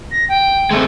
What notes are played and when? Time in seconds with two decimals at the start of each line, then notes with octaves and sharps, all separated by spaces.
0.11 A#6
0.29 G5
0.71 G#3 A3 C4